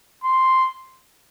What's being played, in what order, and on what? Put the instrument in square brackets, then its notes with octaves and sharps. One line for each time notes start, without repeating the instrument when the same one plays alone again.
[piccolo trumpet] C6